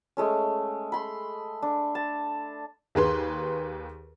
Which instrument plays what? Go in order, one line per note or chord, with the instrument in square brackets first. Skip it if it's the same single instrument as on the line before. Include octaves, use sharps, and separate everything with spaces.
[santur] G#3 A3 C#4
B5 C6
D4
A5
[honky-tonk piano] D#2 G#4 B4 C6